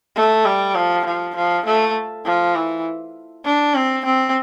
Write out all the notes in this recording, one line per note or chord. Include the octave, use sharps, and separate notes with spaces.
A3
G3
F3
F3
F3
A3
F3
E3
D4
C4
C4